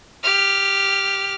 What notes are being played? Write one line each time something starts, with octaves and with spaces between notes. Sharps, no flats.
G4 F6